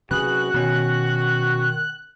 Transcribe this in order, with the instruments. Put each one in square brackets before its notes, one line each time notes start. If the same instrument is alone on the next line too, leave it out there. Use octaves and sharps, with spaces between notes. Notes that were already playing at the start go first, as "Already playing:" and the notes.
[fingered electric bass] C3 F#3 C#4 [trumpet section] F#4 [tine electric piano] G#4 B4 [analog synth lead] F#6
[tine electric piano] B2 C#4 [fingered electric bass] D#3